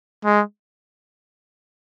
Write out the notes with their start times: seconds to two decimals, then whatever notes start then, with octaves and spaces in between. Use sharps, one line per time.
0.25 G#3